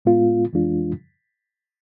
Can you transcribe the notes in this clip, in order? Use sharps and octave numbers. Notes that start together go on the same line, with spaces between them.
A2 G#3 B3 F4
F2 E3 G#3 D4 F4